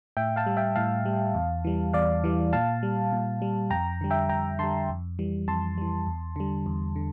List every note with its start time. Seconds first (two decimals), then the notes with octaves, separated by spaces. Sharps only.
0.17 A2 E5 G5
0.36 F5 A5
0.46 G3
0.57 E5 G5
0.76 A2 F5 A5
1.05 G3
1.35 E2
1.65 E3 G3
1.94 E2 D5 F5
2.24 E3 G3
2.53 A#2 F5 A5
2.83 G3
3.13 A#2
3.42 G3
3.70 F2 G5 A#5
4.01 D3 G3
4.11 E5 G5
4.29 F2 G5 A#5
4.59 D3 G3 A5 C6
4.89 F2
5.19 E3 G3
5.48 F2 A5 C6
5.78 E3 G3
6.07 E2
6.36 D3 G3
6.66 E2
6.96 D3